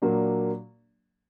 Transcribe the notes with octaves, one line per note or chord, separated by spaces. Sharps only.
A#2 F#3 A#3 D4